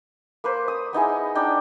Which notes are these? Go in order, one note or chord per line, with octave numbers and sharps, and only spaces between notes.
A#3 B4 C5
D#6
B3 D#4 E4 G#4
D4 D#4 G5